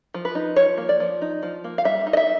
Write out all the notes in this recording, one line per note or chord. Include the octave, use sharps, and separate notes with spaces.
F3
B4
D#4
F3 C#5
A#3
D5
F3
D#4
F3
A#3
F5
G3 E5
D#4
D#5
E5